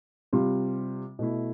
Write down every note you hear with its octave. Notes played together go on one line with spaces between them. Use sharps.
C3 G3 C4 F4
B2 A3 E4